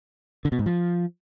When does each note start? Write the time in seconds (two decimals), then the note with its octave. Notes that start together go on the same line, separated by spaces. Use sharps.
0.45 D3
0.52 B2
0.59 G#2
0.66 F3